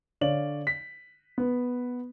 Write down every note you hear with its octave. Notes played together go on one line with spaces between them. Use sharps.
D3 C#5 D5 F5 F#7
B6
B3